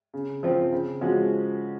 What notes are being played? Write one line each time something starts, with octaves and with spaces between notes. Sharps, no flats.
C#3
F3 C4
C#3
F3 G#3 C#4 F#4